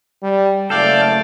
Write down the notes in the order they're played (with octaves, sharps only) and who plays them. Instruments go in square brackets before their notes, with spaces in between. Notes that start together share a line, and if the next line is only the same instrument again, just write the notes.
[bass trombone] G3
[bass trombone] F#1 [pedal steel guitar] A3 A4 [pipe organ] D5 F5 G5